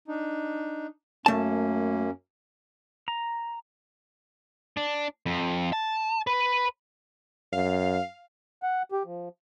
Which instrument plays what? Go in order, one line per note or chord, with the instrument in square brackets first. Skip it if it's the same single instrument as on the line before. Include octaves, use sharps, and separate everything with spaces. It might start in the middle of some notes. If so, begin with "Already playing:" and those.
[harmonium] D4 D#4
[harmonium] F#2 A#3 C#4 [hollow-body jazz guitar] A3 A5
[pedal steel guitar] A#5
[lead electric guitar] D4
F2
A5
B4
[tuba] F#2 [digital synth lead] F5
[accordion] F#5
G4
F3